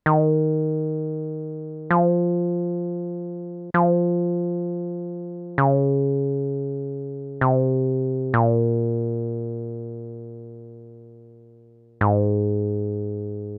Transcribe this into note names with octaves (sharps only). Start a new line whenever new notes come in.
D#3
F3
F3
C#3
C3
A#2
G#2